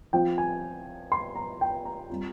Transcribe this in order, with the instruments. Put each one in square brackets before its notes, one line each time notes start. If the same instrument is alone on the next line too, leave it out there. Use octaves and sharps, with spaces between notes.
[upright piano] F3 C4 F4 G5
G#5
C6
A#5
G5
A#5
G3 C4 F4